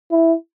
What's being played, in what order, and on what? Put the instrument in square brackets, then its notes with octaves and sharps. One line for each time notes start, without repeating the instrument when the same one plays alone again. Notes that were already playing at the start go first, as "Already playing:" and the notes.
[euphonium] E4